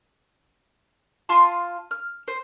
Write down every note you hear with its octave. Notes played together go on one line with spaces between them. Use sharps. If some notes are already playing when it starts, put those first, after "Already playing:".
F4 A5 C6
F6
C5